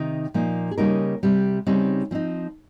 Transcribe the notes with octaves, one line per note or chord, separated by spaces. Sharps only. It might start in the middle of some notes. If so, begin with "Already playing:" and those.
Already playing: C3 D#3 D#4
A#2 F3 A#3 D#4
G#4
C#3 G3 A#3 D#4 A#4
C3 G3 C4
C#3 G3 C4 D#4
F3 C4 D#4